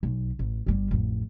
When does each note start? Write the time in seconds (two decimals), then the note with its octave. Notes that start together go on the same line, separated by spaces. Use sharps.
0.03 B1
0.39 A1
0.66 G1 G3
0.91 A1 F2